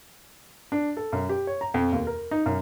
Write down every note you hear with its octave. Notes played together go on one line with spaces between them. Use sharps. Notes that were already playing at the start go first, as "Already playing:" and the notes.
D4
A4
F#2
G4
C#5
A#5
F2
D#2
A#4
D#4
F#2